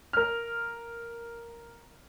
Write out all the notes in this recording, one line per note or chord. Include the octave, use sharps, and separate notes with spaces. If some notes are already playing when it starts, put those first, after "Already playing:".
A#4 F6